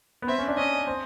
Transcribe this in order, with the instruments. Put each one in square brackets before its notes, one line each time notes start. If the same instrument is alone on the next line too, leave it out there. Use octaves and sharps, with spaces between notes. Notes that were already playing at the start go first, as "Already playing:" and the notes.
[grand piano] B3
[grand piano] C4 [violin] E5
[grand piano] C#4
D4
[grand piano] C#4 [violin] D#5
[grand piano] C4